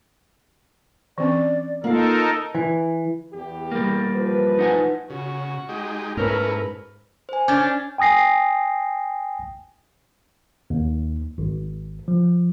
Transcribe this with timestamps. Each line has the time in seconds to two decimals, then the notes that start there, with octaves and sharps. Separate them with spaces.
1.18 E3 C4 C#4 D5
1.84 A#3 D#4 F4 A4 A#4 F5
2.55 E3
3.33 E2 G4
3.72 G3 A#3
4.14 E3 F3 B4
4.59 D#4 F#5 G#5
5.10 C#3 F#4
5.69 G#3 D#4 G4
6.17 G#2 A3 A#3 C#4 E4 A#4 B4
7.29 C5 G#5
7.48 C#4 D4 D6 G6 A6
7.98 G5 G#5 D#6 A#6 C7
10.70 D#2
11.38 G#1
12.08 F3